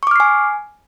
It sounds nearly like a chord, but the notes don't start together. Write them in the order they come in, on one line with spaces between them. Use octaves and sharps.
C#6 D6 F6 C7 G#5